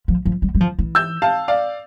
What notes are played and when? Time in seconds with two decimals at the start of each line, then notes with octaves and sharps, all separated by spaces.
0.08 F3
0.25 F3
0.42 G3
0.55 G3
0.60 F3
0.79 E3
0.95 E6 G6
1.22 F5 A5
1.48 D5 F5